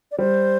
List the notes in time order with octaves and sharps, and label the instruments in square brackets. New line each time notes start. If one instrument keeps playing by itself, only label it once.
[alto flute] D5
[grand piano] G3 [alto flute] C5